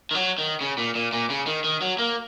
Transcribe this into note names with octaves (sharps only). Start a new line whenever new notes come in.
D#3
F#3
D#3
C#3
A#2
A#2
A#2
C#3
D#3
D#3
F#3
A#3